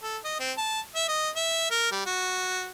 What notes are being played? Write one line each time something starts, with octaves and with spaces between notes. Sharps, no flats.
A4
D#5
C4
A5
E5
D#5
E5
A#4
G3
F#4